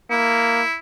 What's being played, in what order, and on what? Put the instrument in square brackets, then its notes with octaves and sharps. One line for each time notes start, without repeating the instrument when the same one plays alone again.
[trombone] A#3 [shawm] E4